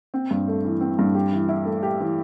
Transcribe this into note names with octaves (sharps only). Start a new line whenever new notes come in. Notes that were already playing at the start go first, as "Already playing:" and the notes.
C4
G2
A3
E3
C4
G2
G4
E3
E4
A3
G4
E3